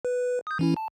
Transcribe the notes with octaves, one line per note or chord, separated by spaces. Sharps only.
B4
D#6 G6
E3 C#4 E4
A5